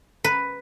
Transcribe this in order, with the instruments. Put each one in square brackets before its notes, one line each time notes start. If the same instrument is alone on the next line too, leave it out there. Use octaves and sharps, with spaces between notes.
[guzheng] B4